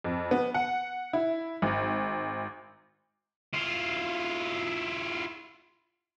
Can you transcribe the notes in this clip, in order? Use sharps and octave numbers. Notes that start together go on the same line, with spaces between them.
F2
B3
F#5
E4
G#1
E4 F4